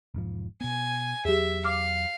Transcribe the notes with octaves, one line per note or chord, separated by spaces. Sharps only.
E1 G#2 F3
B2 B3 G#5
E2 F#3 G4 G#4 E5
F5 D6 F6